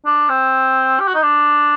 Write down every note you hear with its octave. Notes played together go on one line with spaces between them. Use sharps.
D4
C4
G4
F#4
D#4
D4